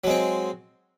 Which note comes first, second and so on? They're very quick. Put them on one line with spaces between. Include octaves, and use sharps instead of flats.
F#3 G#3 C4